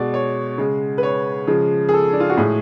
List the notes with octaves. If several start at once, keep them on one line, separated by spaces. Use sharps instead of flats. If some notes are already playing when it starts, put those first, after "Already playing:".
Already playing: B2 G#3 D5
C#5
C#3 G#3
B4
C#5
C#3 F3 G#3
G#4
A4
D4
F4
F#4
A2 G#3 G#4